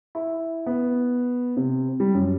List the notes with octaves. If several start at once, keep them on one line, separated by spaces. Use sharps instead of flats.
E4
B3
C3
G3
F#2